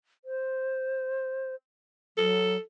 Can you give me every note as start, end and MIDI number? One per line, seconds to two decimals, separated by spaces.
0.25 1.55 72
2.17 2.57 54
2.17 2.60 69